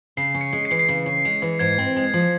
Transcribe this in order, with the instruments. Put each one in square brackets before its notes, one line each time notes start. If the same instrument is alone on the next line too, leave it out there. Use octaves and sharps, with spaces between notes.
[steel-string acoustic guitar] C#3 [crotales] C7
[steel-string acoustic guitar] C#4
[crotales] C#7
[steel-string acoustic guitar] G#3
[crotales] C7
[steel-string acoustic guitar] E3 [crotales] C#7
[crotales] C7
[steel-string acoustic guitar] C#3
C#4
G#3
E3
[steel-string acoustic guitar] G#2 [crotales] G#6
[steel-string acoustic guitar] C4
G#3
F3